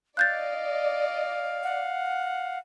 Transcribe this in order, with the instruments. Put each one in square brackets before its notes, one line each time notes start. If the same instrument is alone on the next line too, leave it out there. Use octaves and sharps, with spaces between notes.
[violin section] D5 D#5 [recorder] F5 [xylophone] F#6 G6 A6
[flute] F#5